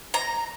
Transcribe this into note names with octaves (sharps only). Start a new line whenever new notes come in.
A#5